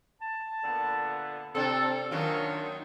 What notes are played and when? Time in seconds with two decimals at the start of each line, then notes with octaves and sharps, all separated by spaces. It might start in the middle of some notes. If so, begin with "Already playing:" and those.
0.21 A5
0.64 A#2 D3 B3
1.55 C3 C4 D4 A4
2.11 F#2 D#3 F#3 A#3 D4 F4 F#4